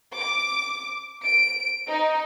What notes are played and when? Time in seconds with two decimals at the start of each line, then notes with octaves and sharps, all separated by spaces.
0.16 D6
1.24 D7
1.88 D#4